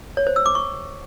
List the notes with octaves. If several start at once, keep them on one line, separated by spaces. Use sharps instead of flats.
C#5
C5
E6
D6
C#6